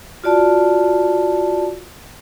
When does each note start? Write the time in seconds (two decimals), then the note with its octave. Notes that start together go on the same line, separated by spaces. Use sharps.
0.24 F4 F#4 D5 A5